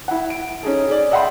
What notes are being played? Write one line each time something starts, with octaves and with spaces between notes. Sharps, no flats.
E4 F#5
D7
C#4 D#4 G#4 A4
G#4 D5
D#5 E5 F#5 G5 B5 C6